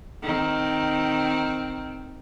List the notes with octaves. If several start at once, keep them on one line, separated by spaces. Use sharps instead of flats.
D#3 C4